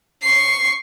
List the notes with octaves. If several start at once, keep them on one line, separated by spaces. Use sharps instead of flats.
C#6 C7